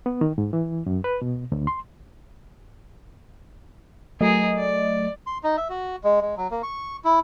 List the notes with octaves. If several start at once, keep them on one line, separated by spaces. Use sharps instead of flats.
B3
D#3
G#2
E3
F#2
B4
B2
D2
C6
F#3 A3 G#4 A#4 D#5
D5
C6
D#4
E5
F#4
G#3
G#3
F#3
A#3
C#6
E4